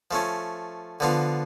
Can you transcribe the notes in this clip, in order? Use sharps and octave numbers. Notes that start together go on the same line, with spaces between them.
F3 A3 C#4
D3 F3 B3 F4